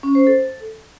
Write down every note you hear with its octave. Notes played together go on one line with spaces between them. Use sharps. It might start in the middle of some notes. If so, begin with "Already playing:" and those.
C#4
C5
A4